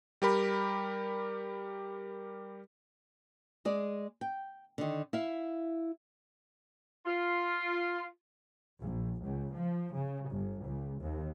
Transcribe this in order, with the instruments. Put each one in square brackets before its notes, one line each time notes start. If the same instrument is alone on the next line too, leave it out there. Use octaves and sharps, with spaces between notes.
[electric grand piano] G3 G4 A#4 B5
[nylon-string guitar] G#3 G#4 D5
G5
D3 D#3
E4 E5 F5
[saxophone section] F4
[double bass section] A#1
C#2
F3
C#3
G1
C#2
D#2